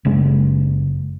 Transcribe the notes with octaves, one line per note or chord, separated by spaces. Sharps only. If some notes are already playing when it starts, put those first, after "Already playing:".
F#1 C#3 G#3